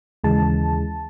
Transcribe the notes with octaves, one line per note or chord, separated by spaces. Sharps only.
D#2 C#3 E3 G#3 A5